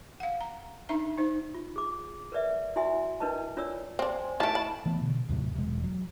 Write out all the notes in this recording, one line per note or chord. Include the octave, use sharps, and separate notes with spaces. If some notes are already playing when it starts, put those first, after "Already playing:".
F5 F#5
A#5
D4 D#4 E5 A#5
D#4 C5
F4
G#4 D6
A#4 B4 D5 E5
E4 F#4 E5 G#5 C6
D4 E4 A#4 B4 D#5 A5
D4 F4 C#5 D5 E6
C4 D4 C5
G#5
D#3 A3 E4 A5 D7
B5
E3 A3 B3
B2 D3
D#2 A2 C3 F#3
E1 G#3
F#3